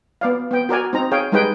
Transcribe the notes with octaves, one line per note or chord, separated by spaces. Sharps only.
B3 D5 F5
B3 G5
F#4 A#4 D5 G#5
C4 D#4 A#5
G#4 C#5 F5 G5
G3 G#3 D#4 G#4 B4 G5